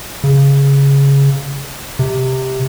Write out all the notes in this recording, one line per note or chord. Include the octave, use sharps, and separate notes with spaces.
C#3
C3